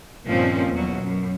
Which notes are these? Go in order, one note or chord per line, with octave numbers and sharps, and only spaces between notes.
G2 A#2 D#3 F3 C4 C#4
E2 B2 F#3
F#2